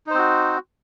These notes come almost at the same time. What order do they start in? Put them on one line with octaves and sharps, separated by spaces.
D#4 C5 C4 F#4